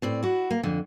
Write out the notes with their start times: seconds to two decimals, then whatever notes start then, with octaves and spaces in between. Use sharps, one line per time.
0.02 A2 C4 D5
0.23 E4 F#4
0.51 A#3
0.63 F2 D3